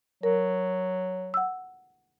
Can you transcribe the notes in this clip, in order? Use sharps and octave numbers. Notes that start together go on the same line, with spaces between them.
F#3 A#4
F#5 E6